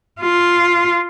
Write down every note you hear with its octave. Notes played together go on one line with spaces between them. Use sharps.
F4